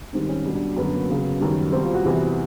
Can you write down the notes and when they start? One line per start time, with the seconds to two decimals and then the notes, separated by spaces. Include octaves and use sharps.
0.13 G#2 D#3 G3 C4
0.29 C#4
0.45 B2 G3 D4
0.56 D4
0.76 F#2 D3 F#3 B3
0.94 A#3
1.09 F#2 C#3 F#3 B3
1.40 F#2 D#3 G3
1.72 B2 C4
1.75 G3
1.83 F4
1.94 F#4
2.04 E2 C3 E3